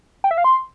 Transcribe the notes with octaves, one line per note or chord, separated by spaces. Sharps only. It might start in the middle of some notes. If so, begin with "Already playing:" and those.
G5
E5
F5
C6